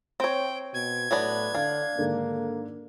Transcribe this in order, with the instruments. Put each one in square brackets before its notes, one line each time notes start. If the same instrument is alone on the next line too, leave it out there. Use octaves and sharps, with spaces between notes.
[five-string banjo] C4 C#5 [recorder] G5
[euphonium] B2 [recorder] G#6
[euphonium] A2 [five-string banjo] F#3 B3 D4
[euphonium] D3 [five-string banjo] D4 [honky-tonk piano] F5
[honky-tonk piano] G#2 D3 D#3 [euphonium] A#3